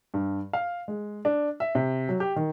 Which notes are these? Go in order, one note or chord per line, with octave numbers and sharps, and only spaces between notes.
G2
F5
G#3
D4
E5
C3
F#3
G4
D#3